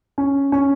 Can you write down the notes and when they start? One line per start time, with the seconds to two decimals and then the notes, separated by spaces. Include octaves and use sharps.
0.18 C#4
0.52 C#4